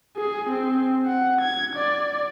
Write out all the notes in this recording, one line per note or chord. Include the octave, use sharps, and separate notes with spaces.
G#4
C4
F#5
G#6
D5